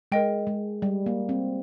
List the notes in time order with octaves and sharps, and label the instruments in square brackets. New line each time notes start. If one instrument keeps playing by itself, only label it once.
[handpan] G#3 [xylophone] A#4 D#5 G5
[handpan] G#3
G3
A#3
C4